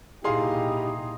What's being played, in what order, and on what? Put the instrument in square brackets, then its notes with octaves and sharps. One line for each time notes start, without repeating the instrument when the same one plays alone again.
[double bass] A#2 D#4 [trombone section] E4 G4 [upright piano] G#4 F5 C6